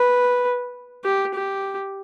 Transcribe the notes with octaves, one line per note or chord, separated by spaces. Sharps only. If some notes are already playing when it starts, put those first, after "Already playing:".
Already playing: B4
G4
G4